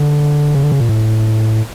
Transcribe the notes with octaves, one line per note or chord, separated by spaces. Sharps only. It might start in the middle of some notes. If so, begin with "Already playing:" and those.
Already playing: D3
C#3
D3
C#3
A#2
A2